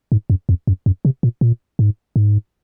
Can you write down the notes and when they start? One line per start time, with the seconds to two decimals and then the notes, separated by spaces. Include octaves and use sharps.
0.12 G#2
0.30 F#2
0.49 F2
0.67 F#2
0.86 F#2
1.05 C3
1.23 A#2
1.41 A#2
1.79 G#2
2.16 G#2